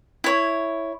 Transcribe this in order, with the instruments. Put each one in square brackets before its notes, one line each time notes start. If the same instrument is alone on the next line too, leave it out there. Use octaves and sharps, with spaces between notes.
[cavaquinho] E4 C#5